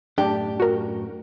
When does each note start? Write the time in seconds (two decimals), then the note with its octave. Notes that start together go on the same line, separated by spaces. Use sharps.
0.18 F#2 A2 D4 G4
0.60 F#4 A#4